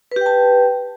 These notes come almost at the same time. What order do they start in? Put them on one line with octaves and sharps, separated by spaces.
B4 G4 G5 A5